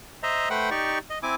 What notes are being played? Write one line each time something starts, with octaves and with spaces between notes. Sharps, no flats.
C5 D#5 E5 A#5
A3 B4 C5 F#5 G5
D#4 G4 D5 C#6
D#5
C4 E4 G#5 D6